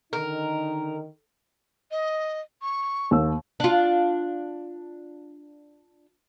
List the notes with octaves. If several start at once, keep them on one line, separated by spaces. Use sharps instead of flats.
D3 D#3 D#4 A#4
D#5
C#6
D#2 E6
D4 F4